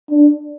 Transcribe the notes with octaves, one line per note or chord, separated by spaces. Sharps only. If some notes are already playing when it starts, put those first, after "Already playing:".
D4